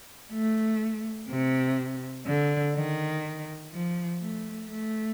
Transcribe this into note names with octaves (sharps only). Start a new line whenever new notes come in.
A3
C3
D3
D#3
F3
A3
A3